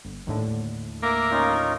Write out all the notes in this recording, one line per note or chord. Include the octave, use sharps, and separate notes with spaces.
G1
D#2 A2 D3
A#3 E5 A#5 D6
C#4 D#4 F4